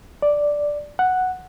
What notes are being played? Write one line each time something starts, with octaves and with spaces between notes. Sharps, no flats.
D5
F#5